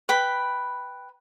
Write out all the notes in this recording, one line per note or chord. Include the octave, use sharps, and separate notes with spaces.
B4 G5 B5